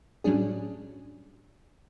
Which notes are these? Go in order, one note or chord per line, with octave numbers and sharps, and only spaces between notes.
A2 F#3 G3 C#4 D4 G#4